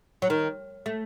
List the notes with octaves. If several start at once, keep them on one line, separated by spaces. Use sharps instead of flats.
F#3
D#3
A3